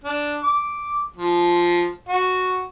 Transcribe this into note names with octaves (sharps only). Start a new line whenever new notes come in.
D4
D6
F3
F#4